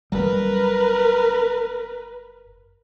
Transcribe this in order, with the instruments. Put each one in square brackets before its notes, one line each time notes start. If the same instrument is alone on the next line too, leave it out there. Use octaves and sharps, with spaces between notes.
[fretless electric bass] F#1 G3 [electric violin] A#4 B4